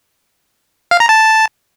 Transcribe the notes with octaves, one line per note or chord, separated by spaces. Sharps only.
F5
A#5
A5